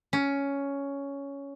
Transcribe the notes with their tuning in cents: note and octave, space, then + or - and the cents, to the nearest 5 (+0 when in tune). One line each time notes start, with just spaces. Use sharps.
C#4 +10